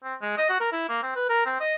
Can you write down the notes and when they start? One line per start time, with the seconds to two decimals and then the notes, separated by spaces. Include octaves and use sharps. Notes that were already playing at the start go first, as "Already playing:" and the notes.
0.04 C4
0.22 G#3
0.38 D#5
0.49 F#4
0.60 A#4
0.72 E4
0.89 A#3
1.03 C4
1.15 B4
1.29 A#4
1.46 C4
1.60 D#5